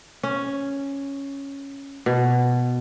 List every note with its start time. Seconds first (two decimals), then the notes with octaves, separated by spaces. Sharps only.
0.23 C#4
2.06 B2